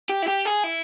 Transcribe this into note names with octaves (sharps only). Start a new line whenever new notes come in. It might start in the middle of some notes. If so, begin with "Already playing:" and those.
G4
E4
G4
G#4
E4